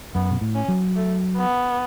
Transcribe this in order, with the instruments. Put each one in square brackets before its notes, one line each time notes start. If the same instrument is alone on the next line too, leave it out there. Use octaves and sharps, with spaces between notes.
[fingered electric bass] F#2 [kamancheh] B3
[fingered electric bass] B2
A2
[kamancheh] C#4
[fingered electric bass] F#3
[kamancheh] A3
B3